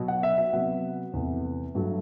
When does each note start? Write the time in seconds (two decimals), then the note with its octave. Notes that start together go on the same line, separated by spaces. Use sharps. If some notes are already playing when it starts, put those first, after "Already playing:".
Already playing: B2 F#3 B3
0.08 F#5
0.23 E5
0.38 E5
0.53 C3 F#3 B3 F#5
1.13 E2 C3 E3 A3
1.75 G2 F#3 A3